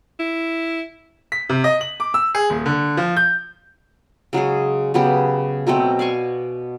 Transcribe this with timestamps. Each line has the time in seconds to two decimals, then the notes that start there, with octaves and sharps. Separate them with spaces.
0.19 E4
1.32 B6
1.49 C3
1.64 D#5
1.81 F#7
2.00 D6
2.14 E6
2.35 G#4
2.50 D#1
2.66 D3
2.97 F3
3.16 G6
4.33 C#3 F#3 G#3 G#4
4.94 C#3 F#3 B3 G4
5.67 B2 F#3 A3 C4
5.99 D5 F5 G#5 C#6